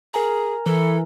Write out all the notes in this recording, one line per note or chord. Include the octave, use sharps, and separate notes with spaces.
G#4 A#4 G#5 A#5
E3 A4